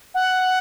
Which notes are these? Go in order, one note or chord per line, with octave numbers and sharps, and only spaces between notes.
F#5